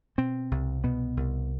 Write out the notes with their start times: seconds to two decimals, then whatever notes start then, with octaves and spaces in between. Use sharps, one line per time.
0.18 B2 C4
0.51 C2
0.84 B2 B3
1.17 C2